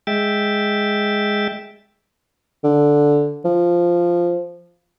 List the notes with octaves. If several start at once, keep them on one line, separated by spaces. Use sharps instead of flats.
G#3 E5 G5 A6
D3
F3